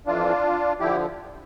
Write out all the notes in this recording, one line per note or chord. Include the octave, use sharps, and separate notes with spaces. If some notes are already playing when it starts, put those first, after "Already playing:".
F2 E3 D4 F4
D3 F3 E4 G4